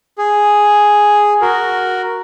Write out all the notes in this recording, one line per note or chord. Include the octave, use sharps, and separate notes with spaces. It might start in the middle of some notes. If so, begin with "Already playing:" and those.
G#4
F#4 A#4